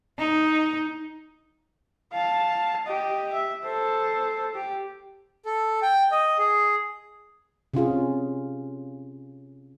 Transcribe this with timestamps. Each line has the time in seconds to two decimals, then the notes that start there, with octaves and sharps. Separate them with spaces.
0.19 D#4
2.13 F5 A5
2.87 G4 D#5
3.33 E5
3.64 A4 C5
4.55 G4
5.45 A4
5.82 G5
6.11 D#5
6.38 G#4
7.74 C3 C#4 F4 G#4